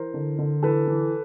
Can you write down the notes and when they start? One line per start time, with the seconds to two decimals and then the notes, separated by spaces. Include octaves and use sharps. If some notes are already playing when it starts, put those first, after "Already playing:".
Already playing: E3 A#4 C5
0.14 D3
0.38 D3
0.63 E3 A4 B4
0.87 E3